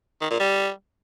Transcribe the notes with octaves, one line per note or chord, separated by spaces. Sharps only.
D#3
A#2
G3